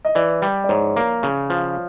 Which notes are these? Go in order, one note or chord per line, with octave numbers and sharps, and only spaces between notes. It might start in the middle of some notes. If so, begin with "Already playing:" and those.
D#5
E3 D5
G3
D5
G#2 C#5
A#3
C#3
F3